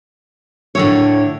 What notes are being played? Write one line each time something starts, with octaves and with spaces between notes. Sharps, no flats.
A2 D3 C#5